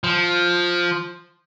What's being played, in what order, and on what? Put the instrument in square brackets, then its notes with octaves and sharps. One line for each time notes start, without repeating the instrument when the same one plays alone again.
[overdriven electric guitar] F3